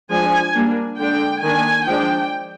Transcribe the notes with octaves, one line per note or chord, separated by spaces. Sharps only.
F3 G#3 D4 G#5
G3 A#3 D4
D3 G#3 D4 G5
D#3 A#3 D4 G#5
F3 G#3 D4 G5